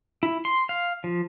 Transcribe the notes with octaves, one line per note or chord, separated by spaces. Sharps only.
E4
C6
F5
F3